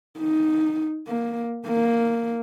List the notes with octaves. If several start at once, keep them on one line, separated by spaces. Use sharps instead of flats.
D#4
A#3
A#3